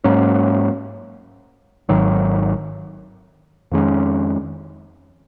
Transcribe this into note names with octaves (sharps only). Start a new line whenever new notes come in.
G#2 F#3 A#3 C#4
G#1 G#2 D#3 F#3
F2 D#3 G#3 C#4